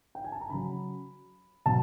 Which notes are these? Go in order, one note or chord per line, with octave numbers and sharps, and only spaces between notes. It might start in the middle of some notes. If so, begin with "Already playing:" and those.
G5
G#5
A5
A#5
C#3 F#3 B5
B2 F#3 A5